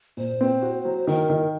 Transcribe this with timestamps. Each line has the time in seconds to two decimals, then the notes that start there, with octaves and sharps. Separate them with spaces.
0.17 A#2 C5
0.41 C4
0.62 F#4
0.85 F#3
1.07 D#3 A#4
1.30 D#3